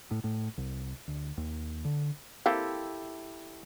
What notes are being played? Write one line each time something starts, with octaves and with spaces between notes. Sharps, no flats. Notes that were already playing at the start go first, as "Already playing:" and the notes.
A2
A2
C2
D2
D#2
D3
A#3 C4 E4 G4 A4 F5